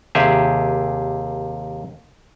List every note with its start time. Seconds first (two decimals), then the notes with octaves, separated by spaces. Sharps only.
0.15 D#2 C3 G4 G#4 E5